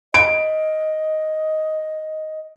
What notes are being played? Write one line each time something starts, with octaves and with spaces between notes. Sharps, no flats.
D#5 D7